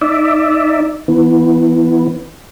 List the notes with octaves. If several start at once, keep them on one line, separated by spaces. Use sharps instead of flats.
D#4 D5 E5
E3 B3